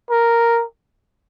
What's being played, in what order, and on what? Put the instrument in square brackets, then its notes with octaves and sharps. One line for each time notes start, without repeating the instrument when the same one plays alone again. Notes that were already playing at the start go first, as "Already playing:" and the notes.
[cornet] A#4